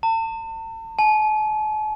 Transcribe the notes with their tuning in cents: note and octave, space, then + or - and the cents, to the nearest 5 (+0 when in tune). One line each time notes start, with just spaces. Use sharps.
A5 +40
A5 -45